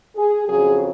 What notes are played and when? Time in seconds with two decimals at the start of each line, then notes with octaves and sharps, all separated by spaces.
0.16 G#4
0.48 F2 C#3 F#3 G#4